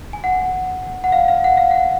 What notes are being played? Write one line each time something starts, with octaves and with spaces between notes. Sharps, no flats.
G#5
F#5
F#5
F5
F5
F#5
F5
F#5